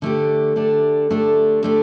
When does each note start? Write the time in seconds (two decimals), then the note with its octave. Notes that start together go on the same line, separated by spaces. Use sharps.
0.02 D3 A3 D4 G4
0.56 D3 A3 D4 G4
1.10 D3 A3 D4 G4
1.63 D3 A3 D4 G4